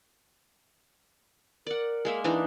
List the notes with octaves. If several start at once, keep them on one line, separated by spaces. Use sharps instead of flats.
A#4 D5 F#5
G#3 A#3 E5
E3 D4 D#4